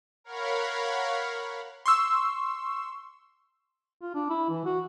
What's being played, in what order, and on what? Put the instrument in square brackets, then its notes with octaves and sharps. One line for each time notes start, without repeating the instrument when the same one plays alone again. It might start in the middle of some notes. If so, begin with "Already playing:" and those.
[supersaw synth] A#4 C#5 F5 F#5 B5
[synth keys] C6 C#6 E6
[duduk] F4
D4
E4
E3
F#4